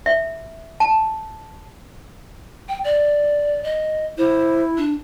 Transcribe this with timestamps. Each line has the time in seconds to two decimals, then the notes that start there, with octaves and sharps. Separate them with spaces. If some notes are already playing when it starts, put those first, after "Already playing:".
0.06 E5
0.80 A5
2.69 G5
2.84 D5
3.64 D#5
4.18 E4 C5
4.78 D4